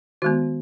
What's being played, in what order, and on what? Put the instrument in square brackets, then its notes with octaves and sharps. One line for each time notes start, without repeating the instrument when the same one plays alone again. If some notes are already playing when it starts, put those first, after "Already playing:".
[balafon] D#3 G#3 B3 F#4